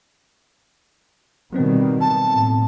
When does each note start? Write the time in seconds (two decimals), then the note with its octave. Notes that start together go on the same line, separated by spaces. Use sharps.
1.53 B2 D#3 F#3 G3 B3 C4
2.01 A5
2.34 A2